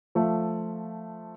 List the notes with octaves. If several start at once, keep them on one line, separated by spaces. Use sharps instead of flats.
F3 A3